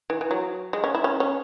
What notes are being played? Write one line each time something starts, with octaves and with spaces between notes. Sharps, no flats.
E3
E3
F#3
G#3
C#4
E4
C#4
C#4